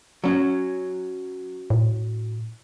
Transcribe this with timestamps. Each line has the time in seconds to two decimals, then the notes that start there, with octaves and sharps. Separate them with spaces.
0.24 F#3 C#4
1.70 A2